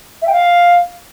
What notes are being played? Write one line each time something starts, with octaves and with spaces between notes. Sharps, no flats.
E5
G5
F5